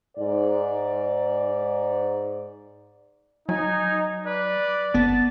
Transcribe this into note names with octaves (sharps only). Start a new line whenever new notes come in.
G#2 D5
F#3 D#4 G#5
B4 D5
G1 B3 A5